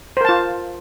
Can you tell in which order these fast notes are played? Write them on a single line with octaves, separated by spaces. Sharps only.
C5 A#4 A5 F4